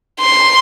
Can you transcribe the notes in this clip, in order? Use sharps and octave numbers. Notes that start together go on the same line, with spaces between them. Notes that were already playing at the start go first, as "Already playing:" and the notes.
C6